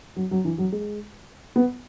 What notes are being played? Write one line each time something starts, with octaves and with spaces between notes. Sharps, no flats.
F#3
F#3
E3
F#3
G#3
B3